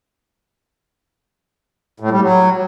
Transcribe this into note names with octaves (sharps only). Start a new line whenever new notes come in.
A2
G3
F#3